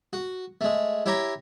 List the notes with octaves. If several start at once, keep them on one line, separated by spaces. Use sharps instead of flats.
F#4
G#3 A3
E4 G4 C#5 G5 A#5